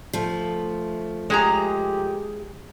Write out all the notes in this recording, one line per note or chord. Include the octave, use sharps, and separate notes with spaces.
F3 A3
G#3 G4 G#4 A#5